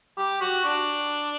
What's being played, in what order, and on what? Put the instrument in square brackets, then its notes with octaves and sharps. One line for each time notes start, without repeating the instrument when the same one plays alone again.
[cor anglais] G4
F#4
D4